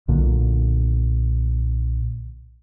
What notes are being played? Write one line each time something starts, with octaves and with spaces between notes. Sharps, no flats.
B1 A#2 D3